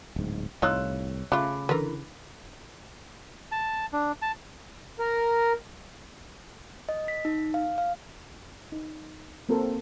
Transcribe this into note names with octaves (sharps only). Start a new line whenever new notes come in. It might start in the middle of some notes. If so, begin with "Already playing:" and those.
D1 G#2
C2 A2 D#4 F4 C#5 E6 F#6
C#3 A3 F4 B5 D6 F#6
D3 E3 A#4 B4
A5
D4
A5
A#4
D#5
B6
D#4
F5
F5
D#4
A#3 C4 F#4 A4 A#4 C5